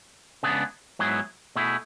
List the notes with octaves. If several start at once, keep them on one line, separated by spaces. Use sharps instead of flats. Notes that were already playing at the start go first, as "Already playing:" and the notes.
C#3 G#3 B3 D4 G#4
G#2 F#3 B3 E4 G#4
B2 A3 E4 G#4